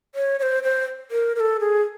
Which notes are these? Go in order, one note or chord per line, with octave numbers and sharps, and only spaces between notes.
C#5
C#5
C5
C5
A#4
A#4
A4
G#4